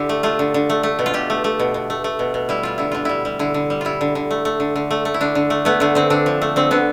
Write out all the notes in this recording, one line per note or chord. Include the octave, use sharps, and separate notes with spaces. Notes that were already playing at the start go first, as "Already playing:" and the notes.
Already playing: D3 E4 G4
A3
A3 F4
D3
D3
A3
A3
B2
F4
B2 G4
A3
A3
B2
B2
A3
A3
B2
B2
G3 E4
G3 F4
D3 E4
D3 F4
G3 E4
G3
D3 E4
D3
G3
G3 E4 F4
D3
D3
A3
A3
D3
D3
A3
A3
E4
D3 D4
D3
A3
A3 B3
D3 A3
D3 C4
D3 D4
F3
A3
D3 C4
D3 B3